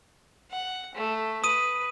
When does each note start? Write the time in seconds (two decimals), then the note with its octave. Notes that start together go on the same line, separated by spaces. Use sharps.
0.51 F#5
0.95 A3
1.44 B4 D#6 D#7